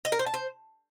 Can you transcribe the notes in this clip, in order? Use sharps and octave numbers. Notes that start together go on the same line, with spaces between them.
D#5
A#4
C5
A5
C5